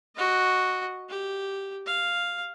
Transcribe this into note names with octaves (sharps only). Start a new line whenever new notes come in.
F#4 D#5
G4
F5